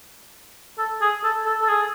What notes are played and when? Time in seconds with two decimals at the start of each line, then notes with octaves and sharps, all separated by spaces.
0.78 A4
1.01 G#4
1.24 A4
1.45 A4
1.61 A4
1.68 G#4